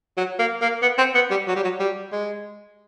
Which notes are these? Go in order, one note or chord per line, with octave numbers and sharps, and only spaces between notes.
F#3
A#3
A#3
B3
C4
B3
G3
F#3
G3
F#3
G3
G#3